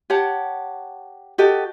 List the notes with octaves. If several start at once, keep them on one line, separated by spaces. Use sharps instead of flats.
G4 C#5 F#5 A5
F#4 G4 A4 D#5